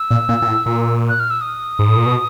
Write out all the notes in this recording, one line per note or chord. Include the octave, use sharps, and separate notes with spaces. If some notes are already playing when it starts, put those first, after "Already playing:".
Already playing: E6
A#2
A#2
A#2
A2
A#2
F#6
F6
E6
D#6
G#2
A2
A#2
B2